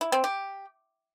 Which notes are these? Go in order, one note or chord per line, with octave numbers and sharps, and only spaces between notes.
E4
C4
G4